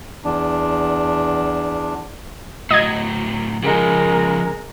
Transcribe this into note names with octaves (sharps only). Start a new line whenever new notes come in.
E2 D4
A2 F#3 D#5 G#6
C#3 F3 G#3 A#4